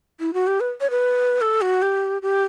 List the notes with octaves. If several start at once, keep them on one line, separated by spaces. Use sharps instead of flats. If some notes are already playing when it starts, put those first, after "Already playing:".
E4
F#4
G4
B4
C#5
B4
A4
F#4
G4
G4